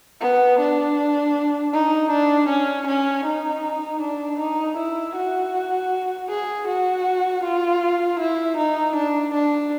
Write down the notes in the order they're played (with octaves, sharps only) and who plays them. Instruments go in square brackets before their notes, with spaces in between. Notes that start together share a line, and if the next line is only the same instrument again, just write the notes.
[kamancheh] B3
D4
D#4
D4
C#4
C#4
D#4
D4
D#4
E4
F#4
G#4
F#4
F4
E4
D#4
D4
D4